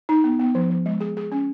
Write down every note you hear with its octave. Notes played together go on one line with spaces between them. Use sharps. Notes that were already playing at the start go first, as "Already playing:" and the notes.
D#4
B3
B3
F3
F3
G#3
G#4
G#4
C#4